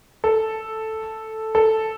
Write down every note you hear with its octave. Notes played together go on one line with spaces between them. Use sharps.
A4
A4